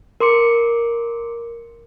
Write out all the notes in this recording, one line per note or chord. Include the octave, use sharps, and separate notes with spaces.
A#4 C6 D6 C#7